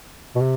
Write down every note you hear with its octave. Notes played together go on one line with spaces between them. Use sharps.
B2
C3